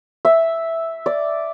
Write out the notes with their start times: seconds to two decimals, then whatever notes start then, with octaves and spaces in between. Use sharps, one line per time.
0.25 E5
1.06 D5